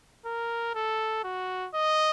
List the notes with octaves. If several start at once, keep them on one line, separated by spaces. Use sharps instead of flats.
A#4
A4
F#4
D#5